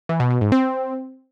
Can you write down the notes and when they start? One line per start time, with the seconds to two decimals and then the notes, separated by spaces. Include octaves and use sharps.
0.09 E3
0.20 B2
0.31 B2
0.41 G#2
0.52 C4